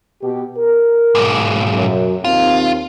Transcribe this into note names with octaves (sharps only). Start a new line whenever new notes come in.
B2 G4
A#4
B1 G#2
F#2 F#3
D#2 C4 F4